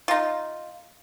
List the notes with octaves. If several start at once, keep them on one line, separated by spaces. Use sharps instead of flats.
D#4 F4